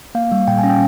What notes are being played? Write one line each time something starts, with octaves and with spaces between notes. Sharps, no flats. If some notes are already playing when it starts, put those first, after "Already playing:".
A#3 F5
G3
A#2 G5
G#5
C#4
G5